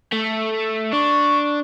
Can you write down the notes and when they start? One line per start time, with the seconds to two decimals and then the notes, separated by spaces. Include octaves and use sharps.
0.12 A3
0.93 D4 C#6